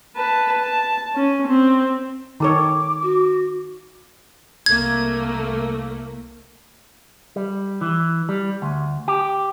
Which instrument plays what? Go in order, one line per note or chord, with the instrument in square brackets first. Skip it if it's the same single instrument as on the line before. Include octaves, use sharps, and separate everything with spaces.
[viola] B4 A5
A5
C#4
C4
[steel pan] D#3 A4 C#5 [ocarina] D6
[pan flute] F#4
[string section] C2 A3 A#3 [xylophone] G#6
[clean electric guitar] G3
E3
G3
D2
G4